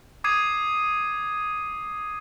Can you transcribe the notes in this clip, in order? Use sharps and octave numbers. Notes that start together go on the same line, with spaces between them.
D6 D#6 G#6 C7 D#7